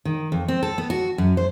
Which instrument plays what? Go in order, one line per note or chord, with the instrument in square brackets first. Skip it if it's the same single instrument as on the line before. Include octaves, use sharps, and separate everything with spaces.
[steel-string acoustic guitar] D#3
F2
C4
A4
B3
F#4
F#2
C5